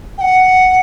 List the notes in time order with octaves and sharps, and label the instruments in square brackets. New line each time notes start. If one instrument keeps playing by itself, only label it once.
[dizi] G5
F#5